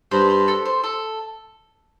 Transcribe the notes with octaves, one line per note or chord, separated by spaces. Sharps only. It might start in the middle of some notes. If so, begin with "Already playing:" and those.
G2 C5
C5
A4
C5
A4